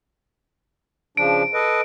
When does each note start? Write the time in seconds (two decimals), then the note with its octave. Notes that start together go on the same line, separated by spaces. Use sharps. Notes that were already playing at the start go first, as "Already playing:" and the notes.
1.17 C#3 F3 D4 D7
1.54 A4 B4 D#5